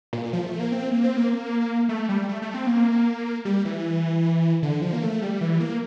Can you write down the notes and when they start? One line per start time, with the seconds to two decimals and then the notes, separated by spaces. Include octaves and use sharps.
0.13 A#2
0.33 F3
0.46 A3
0.59 A#3
0.72 C4
0.91 A#3
1.04 C4
1.17 A#3
1.89 A3
2.09 G3
2.29 A3
2.42 A3
2.54 C4
2.67 A#3
3.45 G3
3.65 E3
4.63 D3
4.82 F3
4.93 A#3
5.02 A3
5.22 G3
5.41 E3
5.60 A#3